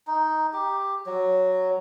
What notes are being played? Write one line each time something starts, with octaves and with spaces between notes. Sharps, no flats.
D#4
G4
F#3